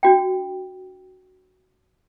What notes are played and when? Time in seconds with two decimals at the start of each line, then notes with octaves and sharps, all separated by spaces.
0.03 D4 F#4 G5